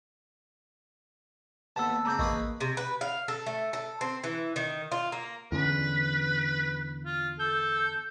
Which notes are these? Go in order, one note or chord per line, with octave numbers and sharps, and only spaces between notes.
D#2 B3 A5 E6
C#3 C4 A#5 D6 G6
A1 A#3 G#4 B4 D#5 C#6
C3
B4
F5
A4
A3
A4
C4
E3
D#3
F4
A#3
E2 D3 C#4 B4
F4
A4 G6